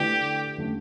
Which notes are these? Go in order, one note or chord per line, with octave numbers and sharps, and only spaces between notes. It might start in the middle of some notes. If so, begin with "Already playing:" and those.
Already playing: D3 A3 E4 G4 B4 D5
D3 A3 C#4